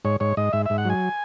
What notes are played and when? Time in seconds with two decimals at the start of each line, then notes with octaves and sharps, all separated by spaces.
0.05 G#2 C#5
0.20 G#2 C#5
0.37 G#2 D#5
0.53 G#2 E5
0.66 G#2 E5
0.78 F#5
0.85 F#3 G#5